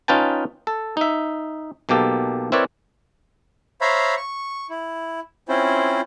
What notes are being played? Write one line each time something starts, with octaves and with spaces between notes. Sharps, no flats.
C#4 D#4 F4 B4 G5 A5
A4
D#4 E5
B1 B2 A#3 G4 A4
C4 E4 A#4 B4 C#5 D5
C5 C#5 E5 F5 A#5 B5
C#6
E4
C4 C#4 E4 F4 C5